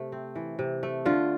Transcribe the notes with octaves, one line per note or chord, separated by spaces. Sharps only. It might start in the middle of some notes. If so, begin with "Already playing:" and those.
Already playing: C3 A3
C4
E3
C3
A3
D3 F4